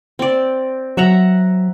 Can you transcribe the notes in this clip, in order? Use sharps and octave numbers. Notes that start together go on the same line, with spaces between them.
C4 D5
F#3 E5 F#5 A#5